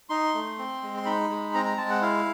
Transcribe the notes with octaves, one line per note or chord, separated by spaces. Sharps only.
D#4 C6
A3
C4
G#3
C6
D#4 B5
G#3
C4 A#5
A#5
G#3 A5
F#5
E4 F5